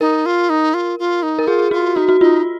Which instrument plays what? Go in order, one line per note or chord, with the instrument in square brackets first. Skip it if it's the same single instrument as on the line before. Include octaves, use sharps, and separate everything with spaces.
[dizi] D#4 [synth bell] A#4
[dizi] F4
D#4
F4
F4
D#4
[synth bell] A#4
[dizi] F4 [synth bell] G#4
[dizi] F4 [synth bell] F#4
[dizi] D#4 [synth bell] F#4
[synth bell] F#4
[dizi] D#4 [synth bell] F4